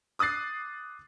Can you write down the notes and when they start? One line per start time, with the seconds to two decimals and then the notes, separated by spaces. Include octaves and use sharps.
0.19 D6 D#6 F#6 A6 C7